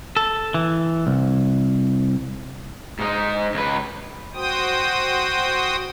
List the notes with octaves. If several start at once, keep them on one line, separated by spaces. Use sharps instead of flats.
A4
E3
C2
G#2 D#4
C#2 B4
F#4 C5 G5 D#6